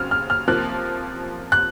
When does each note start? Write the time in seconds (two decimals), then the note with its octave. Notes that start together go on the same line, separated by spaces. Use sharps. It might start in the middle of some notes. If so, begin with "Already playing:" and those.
Already playing: D#2 C#3 F#3 C4 F6
0.11 F6
0.30 F6
0.48 C3 F3 A#3 F#6
1.52 F#6